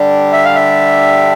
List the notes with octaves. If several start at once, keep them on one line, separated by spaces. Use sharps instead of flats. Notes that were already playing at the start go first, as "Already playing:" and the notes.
Already playing: D3 G3 D4 G4
E5
F5
E5